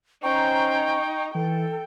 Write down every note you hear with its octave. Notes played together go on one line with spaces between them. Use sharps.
C#4 D#4 C5 G5 A#5 C#6
E3 A4 G5